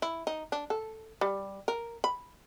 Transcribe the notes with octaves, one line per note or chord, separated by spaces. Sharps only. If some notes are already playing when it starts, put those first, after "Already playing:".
E4
D#4
D4
A4
G3
A#4
B5